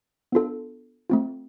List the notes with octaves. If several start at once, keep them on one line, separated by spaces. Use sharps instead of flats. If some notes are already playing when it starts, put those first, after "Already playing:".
B3 D4 F4 A4
A3 C4 F4